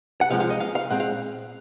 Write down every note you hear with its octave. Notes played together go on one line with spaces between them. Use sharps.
F#5
C2 C3 F3 G#3 F5
F5
D#5
F5
F5
A#2 G#3 C4 F#5
F5